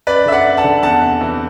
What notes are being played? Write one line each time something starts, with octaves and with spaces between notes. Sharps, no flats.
F#2 B4 D5
D3 E5
D5 F#5
F#2
F#5 A5
D3
E2 F#5 A5
C3
E3